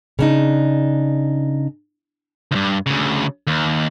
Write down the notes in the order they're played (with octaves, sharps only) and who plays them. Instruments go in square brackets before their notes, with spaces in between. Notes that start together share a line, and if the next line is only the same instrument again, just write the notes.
[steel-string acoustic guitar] C#3 D4 D#4
[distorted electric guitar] D2 G2
D2 C#3
D#2